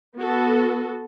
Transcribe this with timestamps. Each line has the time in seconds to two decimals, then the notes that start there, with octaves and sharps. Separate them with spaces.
0.17 B3 F#4 A4